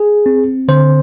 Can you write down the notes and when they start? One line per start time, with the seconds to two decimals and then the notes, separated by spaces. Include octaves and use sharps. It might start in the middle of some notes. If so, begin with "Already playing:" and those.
Already playing: G#4
0.26 C4
0.68 D3 C5